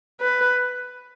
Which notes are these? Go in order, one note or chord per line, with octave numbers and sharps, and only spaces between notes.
B4